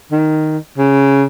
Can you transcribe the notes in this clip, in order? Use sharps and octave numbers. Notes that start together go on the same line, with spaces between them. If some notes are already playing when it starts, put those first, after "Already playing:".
D#3
C#3